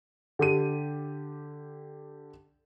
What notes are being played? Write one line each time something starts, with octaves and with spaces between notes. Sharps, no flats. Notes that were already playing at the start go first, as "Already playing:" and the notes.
D3 G4 D#7